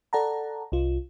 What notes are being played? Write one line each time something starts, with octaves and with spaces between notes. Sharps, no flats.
A4 D5 F#5 A5 A#5
C2 F4